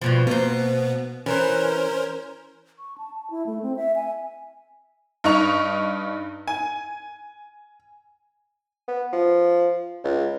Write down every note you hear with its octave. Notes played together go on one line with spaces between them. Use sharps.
G2 B2 F3
B2 A#3 B3 C5
E3 C#4 A#4 C5
C#6
A5
A5
E4
A3
C4
E5
G#5
G2 D#4 C#6 F7
G#5
B3
F3
C#2